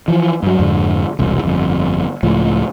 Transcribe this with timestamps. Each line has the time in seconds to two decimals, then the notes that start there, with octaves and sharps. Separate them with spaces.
0.08 E3 F3
0.43 G2 F#3
0.59 F2 G#2 D3
1.19 E1 C2
1.44 G1 F2
2.23 C#2 A2 F3